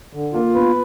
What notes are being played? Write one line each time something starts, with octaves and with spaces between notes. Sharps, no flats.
D3
A#3 F4
B3 B4